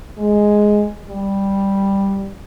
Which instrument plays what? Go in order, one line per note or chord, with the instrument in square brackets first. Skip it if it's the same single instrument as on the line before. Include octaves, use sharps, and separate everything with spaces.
[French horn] G#3
G3